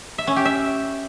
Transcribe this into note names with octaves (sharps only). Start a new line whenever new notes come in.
E5
C#4
G4
E5